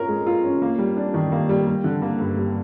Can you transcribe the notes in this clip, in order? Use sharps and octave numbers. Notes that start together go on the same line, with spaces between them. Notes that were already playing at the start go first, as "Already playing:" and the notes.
Already playing: C#4 F4 A#4
G#3
F4
C#4
A#3
G3
D4
D#3
A#3
G3
G3
D3
A#3
G2
G3